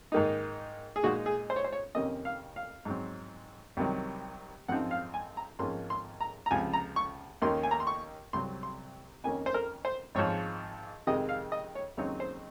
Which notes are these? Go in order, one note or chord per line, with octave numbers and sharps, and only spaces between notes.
G#2 D#3 A#3 D#4
G#4
A#2 G#3 D#4 F#4
G#4
C5
C#5
C5
C#5
F2 C3 D#3 A#3 C#4 D#5
F5
F5
G#2 F#3 C4
C2 C3 D#3 F#3
G#1 F#2 F3 C4 D#4 F#5
F5
G#5
A#5
G#1 G#2 F3 A#3 C#4 C6
C6
A#5
A#5
C#2 C3 F3 G#5
A#5
C#6
D#2 D#3 A#3 C#4 C6
G#5
A#5
C6
C#6
C2 C3 F#3 C4 C6
C6
F2 D#3 A#3 C#4 G#5
C5
A#4
C5
G#1 G#2 F3 C#5
F2 C3 D#3 G#3 D#5
F5
D#5
C#5
D#2 C#3 F#3 C4 D#4 C#5
C5